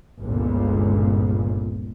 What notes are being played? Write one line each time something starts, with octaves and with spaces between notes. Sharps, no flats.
G1 C#2 A#2